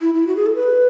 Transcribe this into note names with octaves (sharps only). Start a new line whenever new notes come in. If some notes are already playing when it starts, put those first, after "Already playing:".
E4
E4
F#4
G#4
A4
B4